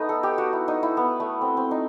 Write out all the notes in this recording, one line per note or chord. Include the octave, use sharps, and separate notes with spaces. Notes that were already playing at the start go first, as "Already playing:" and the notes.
Already playing: A3 B3 D#4
A4
G4
F#4
E4
D#4
E4
B3
A3
C4
C4
D#4